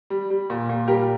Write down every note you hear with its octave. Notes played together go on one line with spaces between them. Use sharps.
G3
G3
A#2
A#2
G3 G4 A#4